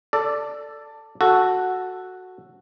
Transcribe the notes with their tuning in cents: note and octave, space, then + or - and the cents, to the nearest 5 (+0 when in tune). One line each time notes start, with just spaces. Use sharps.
A4 +10 D5 +0
F#4 -5 A4 +0